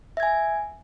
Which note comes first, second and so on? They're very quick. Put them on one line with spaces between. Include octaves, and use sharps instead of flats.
E5 G#6 G#5